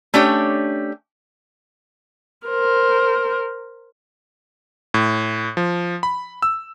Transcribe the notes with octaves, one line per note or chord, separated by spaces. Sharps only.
A3 C#4 D4 G4 C#5
A#4 C5
A2
F3
B5
E6